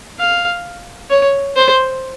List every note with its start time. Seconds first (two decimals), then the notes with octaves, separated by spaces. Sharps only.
0.19 F5
1.11 C#5
1.57 C5